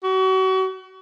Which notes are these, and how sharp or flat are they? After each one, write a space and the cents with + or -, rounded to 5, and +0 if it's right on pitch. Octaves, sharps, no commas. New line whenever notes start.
F#4 +35